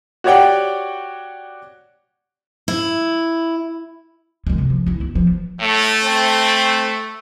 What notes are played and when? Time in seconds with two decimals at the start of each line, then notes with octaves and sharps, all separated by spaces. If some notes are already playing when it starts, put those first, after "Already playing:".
0.24 F#4 G4 C#5 D5 F#5 G5
2.68 E4
4.47 D#3 G#3
4.58 C3
4.70 F3
4.86 E2 E4
5.00 D2
5.15 E3 F3
5.59 A2 A3
6.03 C4